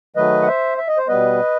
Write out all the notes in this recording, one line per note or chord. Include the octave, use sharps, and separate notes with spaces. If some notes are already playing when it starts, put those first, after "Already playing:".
D#3 F#3 A3 B4 D#5
F#5
C5 E5
E5
D#5
C5
B2 G3 B3 B4 D#5